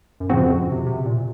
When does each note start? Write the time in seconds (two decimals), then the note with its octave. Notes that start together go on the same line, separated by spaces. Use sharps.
0.20 F#2
0.29 A2 C#3 F3 C4 F#4
0.43 F2
0.72 C3
0.86 C3
1.06 A#2